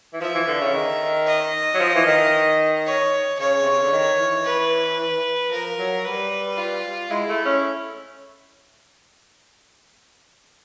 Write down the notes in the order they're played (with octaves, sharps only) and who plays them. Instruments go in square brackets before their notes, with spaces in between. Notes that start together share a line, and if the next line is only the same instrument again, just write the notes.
[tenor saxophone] E3
[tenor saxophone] F3 [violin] E5
[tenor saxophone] E3
D3
C#3
D#3
[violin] D#5
[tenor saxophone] F#3
F3
E3
D#3
[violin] C#5
[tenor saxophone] C#3 [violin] C#5
[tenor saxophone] C3
C#3
D3
D#3
E3
[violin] B4
[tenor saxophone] F3 [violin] A#4
[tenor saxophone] F#3
[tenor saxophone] G3 [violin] B4
[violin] F4
[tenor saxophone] G#3 [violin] E4
[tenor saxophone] A3
C#4